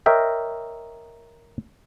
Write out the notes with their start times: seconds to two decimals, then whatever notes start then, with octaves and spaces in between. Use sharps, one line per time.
0.06 A#4 C#5 D#5 E5 G5